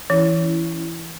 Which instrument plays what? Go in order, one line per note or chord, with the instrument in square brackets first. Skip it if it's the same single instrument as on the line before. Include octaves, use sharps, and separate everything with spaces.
[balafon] E3 [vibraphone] C#4 E4